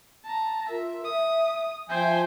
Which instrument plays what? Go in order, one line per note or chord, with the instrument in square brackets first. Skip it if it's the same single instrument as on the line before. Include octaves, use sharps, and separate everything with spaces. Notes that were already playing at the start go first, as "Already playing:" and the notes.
[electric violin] A5 A#5
[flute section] F4 A#4 [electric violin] E5
[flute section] E5 [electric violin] D#6
[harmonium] F3 G#5 [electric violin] C5 G5 [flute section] E5 G6